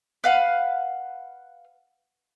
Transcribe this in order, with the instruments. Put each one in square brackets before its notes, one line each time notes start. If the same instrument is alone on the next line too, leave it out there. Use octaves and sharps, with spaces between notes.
[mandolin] B4 F5 F#5